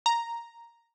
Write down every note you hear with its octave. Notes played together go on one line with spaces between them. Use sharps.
A#5